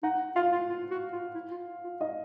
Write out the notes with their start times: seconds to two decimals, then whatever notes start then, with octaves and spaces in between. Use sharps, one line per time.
0.03 D#4 F#5
0.36 F4 F5
0.52 F4
0.69 F4
0.91 F#4
1.12 F4
1.35 E4
1.51 F4
1.84 F4
2.01 D#4 D#5